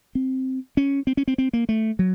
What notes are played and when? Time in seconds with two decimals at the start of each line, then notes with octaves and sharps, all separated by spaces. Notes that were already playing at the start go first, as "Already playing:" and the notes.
0.15 C4
0.77 C#4
1.07 C4
1.17 C#4
1.28 C4
1.38 C4
1.53 A#3
1.69 A3
1.99 F#3